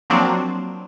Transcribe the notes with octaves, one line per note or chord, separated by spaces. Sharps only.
F3 F#3 A#3 C4 D4